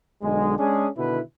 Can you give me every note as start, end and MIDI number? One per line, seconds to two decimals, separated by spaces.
0.22 0.58 35
0.22 0.58 50
0.22 0.58 56
0.58 0.87 56
0.58 0.87 61
0.58 0.87 62
0.58 0.87 68
0.97 1.20 47
0.97 1.20 50
0.97 1.20 51
0.97 1.20 64
0.97 1.20 71